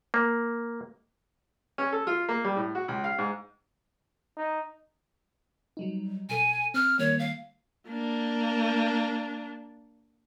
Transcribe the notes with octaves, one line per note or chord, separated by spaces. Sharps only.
A#3
C#4
A4
F4
A#3
G3
A2
F#4
C#2
F5
G#2
D#4
F#3 G3 D#4
B2 A4 G#5
C4 F6
D#3 G3 A#3 C#5
F5
A#3 D4